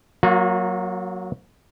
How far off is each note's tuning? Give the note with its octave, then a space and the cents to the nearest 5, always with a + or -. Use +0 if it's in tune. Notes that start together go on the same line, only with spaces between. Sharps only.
F#3 +0 A#3 +0 F#4 -45